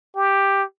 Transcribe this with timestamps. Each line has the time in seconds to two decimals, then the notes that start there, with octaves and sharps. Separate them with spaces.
0.16 G4